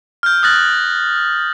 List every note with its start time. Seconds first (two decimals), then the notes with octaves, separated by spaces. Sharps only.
0.23 F6 G6
0.43 D#6 F6 F#6 A6 A#6 F#7